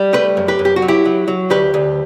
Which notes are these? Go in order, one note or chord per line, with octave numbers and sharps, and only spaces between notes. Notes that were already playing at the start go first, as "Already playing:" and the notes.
Already playing: G3
A3 G4 B4
F#2
G4 B4
F#2
G4
F#4
F#3
E4 G4
F#3
F#3
D2 G4 B4
D2